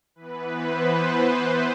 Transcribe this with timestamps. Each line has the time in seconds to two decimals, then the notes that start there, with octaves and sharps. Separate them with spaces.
0.15 E3 B3 B4
0.50 C5
0.85 C5
1.20 C5